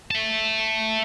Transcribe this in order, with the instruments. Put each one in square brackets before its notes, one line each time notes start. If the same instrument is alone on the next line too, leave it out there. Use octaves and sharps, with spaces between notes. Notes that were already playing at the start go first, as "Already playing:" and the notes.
[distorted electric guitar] E5 A5